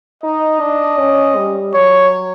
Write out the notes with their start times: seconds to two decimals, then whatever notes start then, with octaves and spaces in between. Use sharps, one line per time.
0.23 D#4 D#5
0.61 D4
0.98 C#4
1.36 G3
1.74 F#3 C#5